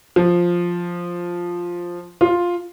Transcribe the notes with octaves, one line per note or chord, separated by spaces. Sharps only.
F3
F4